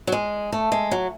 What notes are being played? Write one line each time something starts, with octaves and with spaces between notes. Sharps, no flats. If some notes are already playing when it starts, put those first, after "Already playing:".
F#3
G#3
A3
G#3
F#3